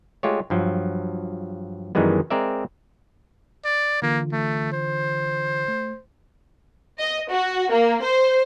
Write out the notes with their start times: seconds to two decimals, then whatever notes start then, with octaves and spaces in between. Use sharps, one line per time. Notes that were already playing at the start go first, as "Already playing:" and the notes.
0.23 G#3 A3 F4 G4 C#5
0.50 G2 F3 F#3
1.95 F#2 D#3 E3 G3 G#3 B3
2.30 G#3 C4 A#4 D5 E5
3.64 D5
4.02 D3 E3 A#3 F4
4.32 A3
4.72 C5
5.68 A3
6.99 D#5
7.31 F#4
7.70 A#3
8.02 C5